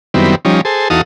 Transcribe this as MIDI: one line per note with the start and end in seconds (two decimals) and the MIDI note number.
0.14 0.35 42
0.14 0.35 51
0.14 0.35 55
0.14 0.35 59
0.14 0.35 60
0.14 0.35 64
0.45 0.61 53
0.45 0.61 55
0.45 0.61 61
0.45 0.61 63
0.65 0.88 68
0.65 0.88 69
0.65 0.88 72
0.90 1.01 40
0.90 1.01 63
0.90 1.01 66
0.90 1.01 69
0.90 1.01 77
0.90 1.01 87